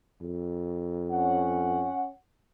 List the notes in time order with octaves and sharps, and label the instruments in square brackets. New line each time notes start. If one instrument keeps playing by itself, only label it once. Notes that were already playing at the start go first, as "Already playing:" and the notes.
[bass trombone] F2
[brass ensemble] C#4 F#5